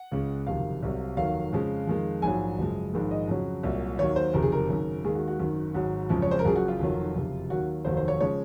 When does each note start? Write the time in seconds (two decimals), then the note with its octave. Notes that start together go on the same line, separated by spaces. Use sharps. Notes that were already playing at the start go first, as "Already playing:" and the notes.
Already playing: F#5
0.12 C#2 C#3 G#3
0.47 F#1 F2 C3 D#3 F5
0.82 C2 C3 F#3
1.17 F1 D#2 D#3 F#3 F5
1.53 F2 C#3 F3 G#3
1.88 F2 D#3 G#3
2.22 A#1 G#2 F#3 G#5
2.58 F#1 F#2 F3 G#3
2.93 A#1 G#2 D#3 G#3
3.11 D#5
3.27 F2 C#3 F#3
3.63 C2 A#2 F#3
3.98 D#2 D#3 F#3 C#5
4.16 C5
4.34 F#1 F2 C3 D#3 A#4
4.43 G#4
4.52 A#4
4.68 G#1 F#2 C#3
5.04 D#2 D#3 G#3 G#4
5.15 F#4
5.28 F#4
5.39 G#1 F#2 D#3
5.74 G#1 G#2 F#3 F#4
6.09 F#1 F2 C#3 F3 G#3
6.22 C#5
6.31 C5
6.39 A#4
6.44 F#1 F#2 C#3 F3 G#4
6.56 F#4
6.68 F4
6.79 F1 F2 D#3 F#3
7.15 F#1 F2 C3
7.50 D#2 D#3 F#3 F#4
7.85 F1 D#2 D#3 F#3 C5
7.97 C5
8.08 C#5
8.21 C#3 F3 G#3 C#5